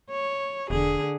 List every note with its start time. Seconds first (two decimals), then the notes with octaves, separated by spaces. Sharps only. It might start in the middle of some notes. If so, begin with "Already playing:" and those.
0.11 C#5
0.70 E1 D3 G#4